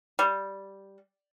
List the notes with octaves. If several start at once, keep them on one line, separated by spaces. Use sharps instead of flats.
G3